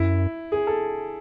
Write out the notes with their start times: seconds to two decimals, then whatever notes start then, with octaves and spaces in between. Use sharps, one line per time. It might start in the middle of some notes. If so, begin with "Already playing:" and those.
Already playing: F#2 E4
0.52 G#4
0.67 A4